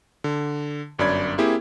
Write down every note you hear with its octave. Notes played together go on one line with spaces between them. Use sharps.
D3
G1 F#2 D4 D5 B5 G#6
A#3 C4 E4 G4 G#4